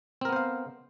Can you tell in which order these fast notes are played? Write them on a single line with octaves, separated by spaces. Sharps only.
C4 A#4 B3 C5 F5